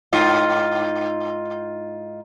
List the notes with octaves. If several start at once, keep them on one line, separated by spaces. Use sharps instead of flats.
G#2 D#4 F4